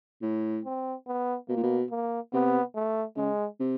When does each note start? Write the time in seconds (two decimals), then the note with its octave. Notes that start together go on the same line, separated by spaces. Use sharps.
0.22 A2
0.65 C4
1.07 B3
1.48 B2 A#3
1.56 A#2
1.63 B2
1.90 A#3
2.33 C3 B3
2.75 A3
3.17 C#3 G#3
3.60 C3